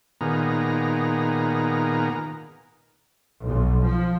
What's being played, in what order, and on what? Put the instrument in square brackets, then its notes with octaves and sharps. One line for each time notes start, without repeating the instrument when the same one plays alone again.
[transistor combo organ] A#2 D#3 B3 G#4 A#5
[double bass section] B1
F3